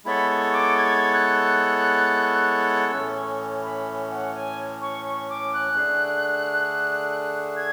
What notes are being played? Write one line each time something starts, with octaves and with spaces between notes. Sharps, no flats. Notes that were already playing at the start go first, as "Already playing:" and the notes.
G#3 B3 E4 A4 C#5 B5
C#6
D6
G#6
F#6
A2 E3 A3 C#4 E6
C#6
B5
F#5
G#5
C#6
C#6
D6
F#6
D3 A3 D4 G#4
F#6
G#6